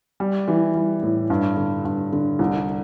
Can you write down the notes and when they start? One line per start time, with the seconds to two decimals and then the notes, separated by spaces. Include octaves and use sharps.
0.20 G3
0.48 E3
0.75 G3
1.03 A2
1.30 G2
1.57 D3
1.85 G2
2.12 D3
2.39 C2